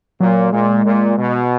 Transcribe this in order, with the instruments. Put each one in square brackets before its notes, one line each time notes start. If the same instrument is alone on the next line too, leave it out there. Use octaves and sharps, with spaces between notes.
[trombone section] A#2 [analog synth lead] F#3
[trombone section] A#2 [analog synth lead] G#3
[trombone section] A#2
B2